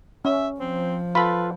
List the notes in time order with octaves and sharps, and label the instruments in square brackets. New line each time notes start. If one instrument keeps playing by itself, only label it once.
[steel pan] C#4 [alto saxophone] E5
[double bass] F3 [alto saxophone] C4
[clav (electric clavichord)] F4 A4 F5 [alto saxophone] B4 [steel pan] B5